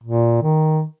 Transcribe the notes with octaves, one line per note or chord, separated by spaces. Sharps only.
A#2
D#3